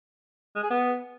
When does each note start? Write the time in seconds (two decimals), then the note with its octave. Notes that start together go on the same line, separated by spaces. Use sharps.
0.56 G#3
0.63 G#4
0.70 B3